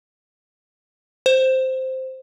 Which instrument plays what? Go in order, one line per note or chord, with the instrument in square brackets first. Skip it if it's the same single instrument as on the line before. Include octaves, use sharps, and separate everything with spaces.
[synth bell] C5